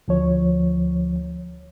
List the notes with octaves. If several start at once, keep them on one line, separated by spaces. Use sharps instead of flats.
D2 F3 C#5